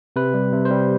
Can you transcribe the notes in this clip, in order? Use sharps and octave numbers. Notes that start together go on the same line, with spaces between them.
C3 B4
G3
C3
C5
G3